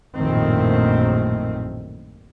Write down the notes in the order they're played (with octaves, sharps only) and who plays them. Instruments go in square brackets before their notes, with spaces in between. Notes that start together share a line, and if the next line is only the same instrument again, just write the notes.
[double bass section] A#1 F#2 A2 D#3 A3 C4